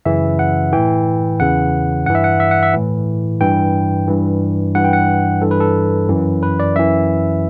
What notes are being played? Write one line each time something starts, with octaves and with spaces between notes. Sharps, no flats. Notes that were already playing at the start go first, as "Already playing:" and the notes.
F#2 C#3 E3 E5
F#5
A2 E3 G5
E2 C#3 E3 F#5
G2 E3 F#5
E5
F#5
E5
F#5
E5
A2 E3
G2 E3 G5
G2 E3
G2 E3 F#5
G5
F#5
G2 E3 A4
B4
A4
F#2 E3
B4
D5
F#2 E3 E5